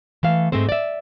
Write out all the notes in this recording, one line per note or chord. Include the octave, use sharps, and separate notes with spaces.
E3 A3 F5
G#2 G#3 A3 C4 C5
D5 E5